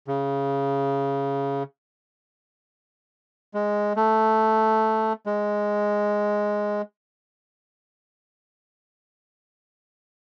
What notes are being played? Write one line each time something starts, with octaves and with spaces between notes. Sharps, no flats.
C#3
G#3
A3
G#3